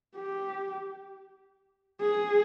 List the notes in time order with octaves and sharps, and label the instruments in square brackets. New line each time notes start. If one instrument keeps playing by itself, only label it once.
[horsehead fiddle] G4
G#4